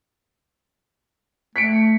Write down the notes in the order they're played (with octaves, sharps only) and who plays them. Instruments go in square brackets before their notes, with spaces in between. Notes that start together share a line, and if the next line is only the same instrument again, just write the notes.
[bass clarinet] A3 [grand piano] B6 C#7 D7